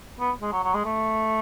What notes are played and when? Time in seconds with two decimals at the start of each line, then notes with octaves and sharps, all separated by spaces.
0.20 B3
0.42 G#3
0.52 F#3
0.63 F#3
0.74 G#3
0.85 A3